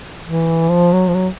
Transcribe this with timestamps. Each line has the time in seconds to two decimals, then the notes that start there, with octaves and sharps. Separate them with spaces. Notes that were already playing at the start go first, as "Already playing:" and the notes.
0.24 E3
0.69 F3
0.93 F#3
1.08 F3
1.14 F#3